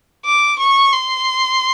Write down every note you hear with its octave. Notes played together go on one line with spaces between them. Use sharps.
D6
C#6
C6